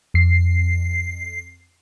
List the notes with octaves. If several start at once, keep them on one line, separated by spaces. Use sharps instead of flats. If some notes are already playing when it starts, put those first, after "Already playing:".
F2 C7